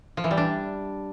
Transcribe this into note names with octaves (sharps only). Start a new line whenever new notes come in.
F3
E3
G3
D4